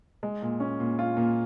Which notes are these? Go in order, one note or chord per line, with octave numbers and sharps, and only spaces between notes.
G#3
A#2
C#4
A#2
F4
A#2